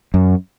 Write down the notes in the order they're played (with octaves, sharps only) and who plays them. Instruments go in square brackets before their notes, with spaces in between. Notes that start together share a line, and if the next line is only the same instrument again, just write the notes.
[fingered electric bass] F#2